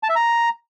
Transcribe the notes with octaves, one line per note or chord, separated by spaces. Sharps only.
A5
E5
A#5